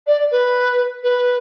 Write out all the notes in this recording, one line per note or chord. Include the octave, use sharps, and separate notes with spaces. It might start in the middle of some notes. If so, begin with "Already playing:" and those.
D5
B4
B4